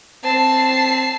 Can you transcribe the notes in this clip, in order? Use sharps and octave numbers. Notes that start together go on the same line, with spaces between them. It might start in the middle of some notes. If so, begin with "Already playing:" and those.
C4 A5 C7